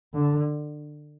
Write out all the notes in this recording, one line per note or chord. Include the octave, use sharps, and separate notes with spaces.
D3